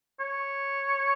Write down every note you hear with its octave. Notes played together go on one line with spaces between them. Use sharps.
C#5